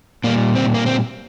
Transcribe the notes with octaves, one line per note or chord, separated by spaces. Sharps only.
A#2 G3 A#3
C4
A#3
C4